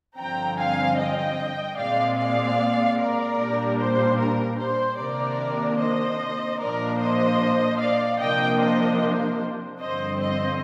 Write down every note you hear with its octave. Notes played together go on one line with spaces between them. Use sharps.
G2 D3 F3 C4 G5 A#5
F5 G#5
D#5 G5
A#2 G#3 C4 D5 F5
D5 F5
A#4 D5
A#2 G3 D4
C5
A#4
C5
C3 D#3 A#3 D4 A#4 D5
C5 D#5
A#2 F3 A#3 D4 A#4 D5
C5 D#5
D5 F5
C3 F3 A#3 D4 D#5 G5
C5 D#5
C5
G2 D3 F3 C4 C5 D#5
C5 D#5